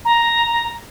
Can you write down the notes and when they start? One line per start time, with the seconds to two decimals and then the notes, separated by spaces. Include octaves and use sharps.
0.05 A#5